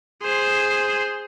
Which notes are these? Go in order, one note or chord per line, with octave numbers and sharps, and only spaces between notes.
G#4 C5